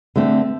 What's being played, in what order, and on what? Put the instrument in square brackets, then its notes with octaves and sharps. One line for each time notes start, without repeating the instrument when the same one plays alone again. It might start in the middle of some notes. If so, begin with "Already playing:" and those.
[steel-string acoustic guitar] D3 A3 C4